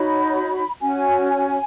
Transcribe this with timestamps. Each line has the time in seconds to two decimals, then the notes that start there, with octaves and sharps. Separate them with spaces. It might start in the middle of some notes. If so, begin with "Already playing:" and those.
Already playing: D#4 F#4 C#5 B5
0.81 C#4 F#4 C#5 G#5
1.28 G#5